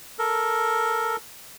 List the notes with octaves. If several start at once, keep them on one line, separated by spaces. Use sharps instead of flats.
A4 A#4